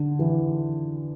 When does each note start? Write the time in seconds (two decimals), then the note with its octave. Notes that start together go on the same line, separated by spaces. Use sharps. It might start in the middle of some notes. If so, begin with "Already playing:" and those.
Already playing: D3
0.19 E3